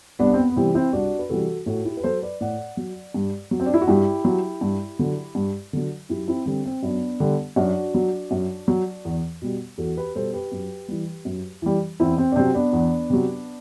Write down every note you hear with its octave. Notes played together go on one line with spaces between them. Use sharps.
C2 B3 D4
C4
B3
B3
C3 E3 G3 C4
C4 E4
C2 D4 F#4
B4
C3 E3 G3 F#4 A4
A2 F#4 A4
E4 G4
B4
F#3 A4 C5
B4 D5
A2 D5 F#5
F#3
G2
F#3
C4
D4
E4
F#4
G2 E4 G4
F#3
G2
D3 F#3
G2
D3 F#3
F#2 E4 G4
C4 E4
D3 G3 C4
C4
F#2 B3 D4
D3 G3
F#2 D4 F#4
F#3
F#2
F#3
E2
B2 G3
E2 F#4 A4
G4 B4
B2 G3 A4 C5
G4 B4
F#2
E3 G3
F#2
E3 G3
E2 C4 E4
C4
D4
C3 F#3 C4
B3 D4
E2
C3 F#3